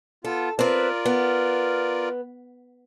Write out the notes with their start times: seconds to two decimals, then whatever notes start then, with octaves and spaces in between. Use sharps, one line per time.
0.25 B3 F4 A4
0.59 C4 F4 A#4 B4 D5
1.05 B3